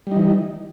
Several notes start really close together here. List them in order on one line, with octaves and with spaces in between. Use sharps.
G3 D#4 E3